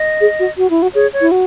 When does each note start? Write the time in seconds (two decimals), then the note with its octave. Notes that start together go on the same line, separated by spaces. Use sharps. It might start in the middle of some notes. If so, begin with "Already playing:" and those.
Already playing: D#5
0.21 G#4
0.40 F#4
0.58 F#4
0.70 E4
0.82 F#4
0.94 G#4 C#5
1.13 C#5
1.21 E4
1.31 F#4